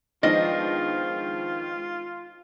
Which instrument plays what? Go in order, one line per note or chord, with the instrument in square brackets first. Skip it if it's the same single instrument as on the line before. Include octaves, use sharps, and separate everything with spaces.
[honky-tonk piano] D#3 F3 [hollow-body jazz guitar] G#3 B3 D4 [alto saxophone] F4 [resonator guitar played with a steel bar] D#5